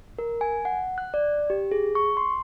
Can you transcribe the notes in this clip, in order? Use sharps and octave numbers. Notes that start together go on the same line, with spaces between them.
A#4
G#5
F#5
F#6
D5
G4
G#4
C#6
C6